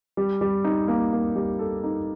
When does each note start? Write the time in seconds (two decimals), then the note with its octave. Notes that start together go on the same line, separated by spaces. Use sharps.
0.17 G3
0.41 G3
0.64 D#4
0.88 A#3
1.12 A#3
1.36 G3
1.59 A4
1.84 D#4